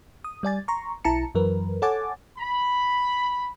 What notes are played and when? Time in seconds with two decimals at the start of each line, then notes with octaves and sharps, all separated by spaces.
0.24 D#6
0.43 G3 D5 G#5 A6
0.68 A#5 C6 C#6
1.05 B1 E4 A5 A#5 C#7
1.35 F#2 E3 F#3 A#4 B4
1.82 A4 C#5 F#5 G#5 D6 A6
2.38 B5